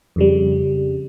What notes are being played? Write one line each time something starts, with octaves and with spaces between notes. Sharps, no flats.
F2 C#3 G3